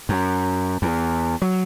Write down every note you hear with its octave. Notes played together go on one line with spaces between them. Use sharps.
F#2
E2
F#3